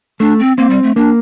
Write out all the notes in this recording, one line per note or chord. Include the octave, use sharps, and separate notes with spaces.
A3 D4
C4
A#3 C4
G3
A3
A#3 D4